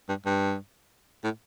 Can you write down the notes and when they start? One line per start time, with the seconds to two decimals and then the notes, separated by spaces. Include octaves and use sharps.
0.09 G2
0.26 G2
1.24 A2